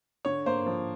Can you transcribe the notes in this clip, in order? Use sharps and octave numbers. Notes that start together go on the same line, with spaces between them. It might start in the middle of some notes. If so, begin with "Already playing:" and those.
D3 C#5
A#3 C5
F3